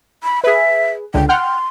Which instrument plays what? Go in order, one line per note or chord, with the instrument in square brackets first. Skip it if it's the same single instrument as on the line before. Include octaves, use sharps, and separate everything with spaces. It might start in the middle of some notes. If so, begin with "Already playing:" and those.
[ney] B5
[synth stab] G#4 B4 [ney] E5
[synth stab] C#2 D3 [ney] G5
[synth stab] F#5 G5 F6 [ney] C6